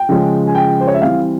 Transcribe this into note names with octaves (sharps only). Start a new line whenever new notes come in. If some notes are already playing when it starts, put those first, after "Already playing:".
Already playing: G5
C#3 F3 G#3 C#4
G#5
G5
C5
C#5
E5
E3 G3 C4 F5